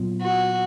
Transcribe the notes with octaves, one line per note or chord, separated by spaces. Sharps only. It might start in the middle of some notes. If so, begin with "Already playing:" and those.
Already playing: A#2 F#3 B3 F4
F#4